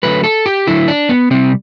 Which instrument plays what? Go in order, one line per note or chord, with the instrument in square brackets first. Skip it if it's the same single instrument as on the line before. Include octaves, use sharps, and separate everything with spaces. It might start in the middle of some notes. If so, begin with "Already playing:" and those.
[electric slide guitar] D3 F#3 A3 B4
A4
G4
D3 F#3 A3 E4
D4
B3
C3 G3 C4